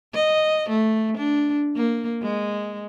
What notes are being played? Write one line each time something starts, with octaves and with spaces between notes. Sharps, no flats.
D#5
A3
D4
A#3
G#3